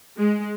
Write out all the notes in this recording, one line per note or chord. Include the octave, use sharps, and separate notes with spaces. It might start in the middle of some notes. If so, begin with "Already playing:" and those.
G#3